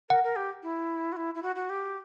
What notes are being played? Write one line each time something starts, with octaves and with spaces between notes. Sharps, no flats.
A#4 F#5
A#4
G4
E4
F#4
E4
E4
F#4
F#4
G4